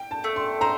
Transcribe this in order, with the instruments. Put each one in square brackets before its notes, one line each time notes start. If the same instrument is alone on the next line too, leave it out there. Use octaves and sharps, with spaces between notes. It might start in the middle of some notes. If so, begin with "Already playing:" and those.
Already playing: [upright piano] G5
A5
[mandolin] A3
[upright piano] C6
[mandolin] C5 [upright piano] A#5